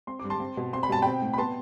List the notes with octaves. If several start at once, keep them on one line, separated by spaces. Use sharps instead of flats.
C4 C6
G2 D6
A5 C6
C4
B2
C4 C6
B5
B2 A5
C4 G5 B5
A2
B5
B3 A5 C6